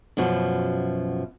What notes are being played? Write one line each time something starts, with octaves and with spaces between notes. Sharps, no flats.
F#2 B2 F3 F#4